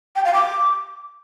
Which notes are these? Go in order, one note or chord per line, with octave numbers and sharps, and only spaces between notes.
G5
F5
D6